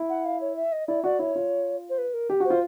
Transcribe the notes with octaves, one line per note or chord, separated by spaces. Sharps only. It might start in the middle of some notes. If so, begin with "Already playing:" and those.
Already playing: E4
F#5
F5
C#5
E5
D#5
E4 D5
F#4 D5
E4 C#5
F4
C5
B4
A#4
G4
F#4 C5
F4